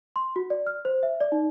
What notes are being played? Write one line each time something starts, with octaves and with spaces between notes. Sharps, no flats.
C6
F#4
D5
F6
C5
E5
D5
D#4